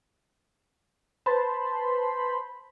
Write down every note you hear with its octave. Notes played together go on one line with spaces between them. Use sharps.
B4 C5 A5 B5 C6